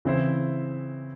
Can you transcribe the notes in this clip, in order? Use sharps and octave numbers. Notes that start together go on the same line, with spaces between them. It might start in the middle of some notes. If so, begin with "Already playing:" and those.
C#3 E3 C4 E4 C5